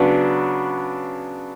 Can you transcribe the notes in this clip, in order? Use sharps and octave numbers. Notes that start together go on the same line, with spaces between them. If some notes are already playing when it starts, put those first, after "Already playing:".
Already playing: C#3 F#3 B3 D4